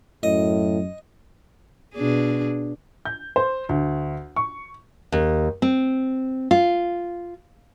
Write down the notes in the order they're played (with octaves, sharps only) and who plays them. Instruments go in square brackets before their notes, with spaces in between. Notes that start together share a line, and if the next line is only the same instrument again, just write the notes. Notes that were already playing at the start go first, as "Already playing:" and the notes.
[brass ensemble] F#2 [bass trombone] A2 [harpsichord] D#5
[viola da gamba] B2 D4 G#4
[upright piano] G6
C5
D2
C#6
[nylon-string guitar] D#2
C4
F4